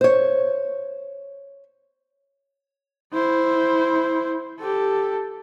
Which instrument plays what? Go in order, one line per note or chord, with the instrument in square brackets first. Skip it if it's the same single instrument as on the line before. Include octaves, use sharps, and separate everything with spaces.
[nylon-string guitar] C5 C#5
[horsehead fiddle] E4 C5
G4 A4